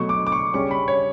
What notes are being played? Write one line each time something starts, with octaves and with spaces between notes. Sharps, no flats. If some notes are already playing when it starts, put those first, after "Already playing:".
Already playing: B2 F#3 A3 C#6
D6
D6
C#6
C#3 G3 C#4 C#6
B5
C#5